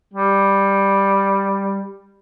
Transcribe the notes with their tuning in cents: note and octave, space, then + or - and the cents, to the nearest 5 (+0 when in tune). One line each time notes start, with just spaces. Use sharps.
G3 +5